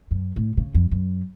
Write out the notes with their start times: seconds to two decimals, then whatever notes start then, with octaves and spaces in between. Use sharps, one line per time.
0.11 F#2
0.36 A2
0.57 C#3
0.74 F2
0.91 F#2